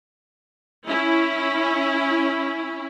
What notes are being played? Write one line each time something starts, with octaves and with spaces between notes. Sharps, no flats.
C#4 E4